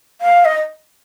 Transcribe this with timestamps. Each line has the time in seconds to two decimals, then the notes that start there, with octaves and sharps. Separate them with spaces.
0.21 F5
0.45 D#5